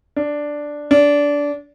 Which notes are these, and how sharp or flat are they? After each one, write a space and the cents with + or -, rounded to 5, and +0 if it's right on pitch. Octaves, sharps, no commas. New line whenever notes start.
D4 +0
D4 -20